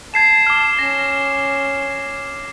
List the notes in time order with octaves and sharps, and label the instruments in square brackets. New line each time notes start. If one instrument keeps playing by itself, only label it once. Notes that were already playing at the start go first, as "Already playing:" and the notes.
[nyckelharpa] A5 [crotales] G#6 C7 E7
[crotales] D6 F6
[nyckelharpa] C#4 [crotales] A#6